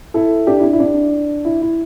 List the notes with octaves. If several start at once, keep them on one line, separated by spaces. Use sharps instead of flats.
E4 A4
D4 G4
E4
D4
E4
D4
E4
E4